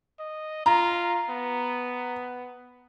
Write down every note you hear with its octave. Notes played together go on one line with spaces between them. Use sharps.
D#5
F4 A#5
B3